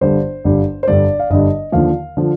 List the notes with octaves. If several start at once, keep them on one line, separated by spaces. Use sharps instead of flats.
G1 G2 D3 G3 C5
G1 G2 D3 G3
C5
G1 G2 D3 G3 D5
F5
G1 G2 D3 G3 D#5
D#2 D3 F3 F5
D3 F3